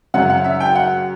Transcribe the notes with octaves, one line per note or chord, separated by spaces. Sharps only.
F#2 C#3 F#3 F#5
F#5
E5
G5
F#5